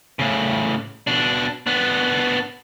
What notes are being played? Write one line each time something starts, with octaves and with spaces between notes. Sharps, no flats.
A2 C#3
B2 D4
B3 D4